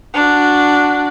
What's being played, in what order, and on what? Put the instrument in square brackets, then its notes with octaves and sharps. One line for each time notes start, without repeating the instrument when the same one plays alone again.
[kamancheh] D4 F#4